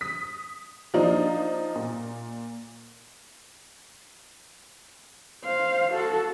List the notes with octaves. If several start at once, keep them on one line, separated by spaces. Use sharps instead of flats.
D#6 B6
F3 A#3 D4 D#4 F4
A#2
C5 F5
F#4 A4